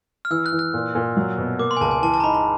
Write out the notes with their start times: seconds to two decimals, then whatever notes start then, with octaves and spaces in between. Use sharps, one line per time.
0.25 F6
0.31 E3 E6
0.46 F#6
0.52 E3
0.59 F#6
0.74 A#2
0.95 A#2
1.17 F#3
1.38 B2
1.59 A#3 D6
1.71 C6
1.77 G#5
1.81 C#2 A5
1.91 G#5
2.02 E3 A5
2.14 A5
2.20 A#5
2.24 D#4 B5
2.34 A#5